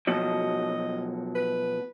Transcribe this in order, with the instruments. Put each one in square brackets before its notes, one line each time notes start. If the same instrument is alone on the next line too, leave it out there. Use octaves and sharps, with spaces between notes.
[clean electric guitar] B2 F3 F#3 [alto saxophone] D#5
[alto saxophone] B4